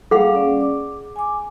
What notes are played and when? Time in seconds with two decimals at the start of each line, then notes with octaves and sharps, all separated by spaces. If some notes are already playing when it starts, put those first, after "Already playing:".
0.11 G3 A#3 G#4 F5 F#5
0.33 C#4 D5
0.61 D6
1.16 G#5 D6